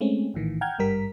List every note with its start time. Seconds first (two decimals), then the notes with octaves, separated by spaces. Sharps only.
0.01 G#3 A3 C4 C#4
0.34 A#1 A2 D#3 E3
0.61 F#5 G5 A#5 F6 G6 G#6
0.78 G#1 G2 G3 A#4 B6